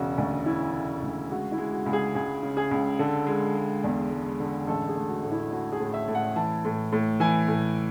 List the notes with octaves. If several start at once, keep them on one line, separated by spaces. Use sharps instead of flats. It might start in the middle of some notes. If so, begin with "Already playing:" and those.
Already playing: E1 C#3 F#4
D2
C#3 E4
C#3
D2
G#3 F#4
E4
G#3
F#4
C#2
G#4
C#2 G#4
C#3
G#4
C#2
D3 A4
G#3
G#3
E2
G#3
D3
A1 A4
G#4
A3
F#4
A2
E4
A3 F#4
G#4
A2
E5
A2
F#5
E3 A5
A2
A2
E3 G#5
A2